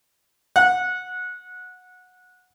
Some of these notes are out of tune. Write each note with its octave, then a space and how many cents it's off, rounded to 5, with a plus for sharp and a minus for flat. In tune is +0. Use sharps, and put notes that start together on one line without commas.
F#5 -20